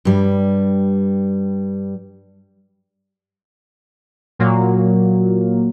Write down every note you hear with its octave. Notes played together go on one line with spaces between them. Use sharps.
G2 G3
A#2 F#3 A#3